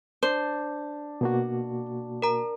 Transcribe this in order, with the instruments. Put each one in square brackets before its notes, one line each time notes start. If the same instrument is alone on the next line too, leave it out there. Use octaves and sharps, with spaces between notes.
[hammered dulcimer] D4 [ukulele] C5
[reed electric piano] B2 A#3 F#4
[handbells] A#4 A#5